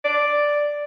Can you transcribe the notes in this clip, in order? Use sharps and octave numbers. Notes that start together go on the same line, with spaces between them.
D5